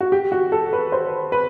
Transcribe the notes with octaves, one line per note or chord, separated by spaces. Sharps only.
F#4
G4
F#4
A4
B4
C5
B4